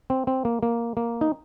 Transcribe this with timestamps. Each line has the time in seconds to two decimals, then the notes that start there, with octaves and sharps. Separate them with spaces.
0.10 C4
0.27 C4
0.45 A#3
0.63 A#3
0.97 A#3
1.21 D#4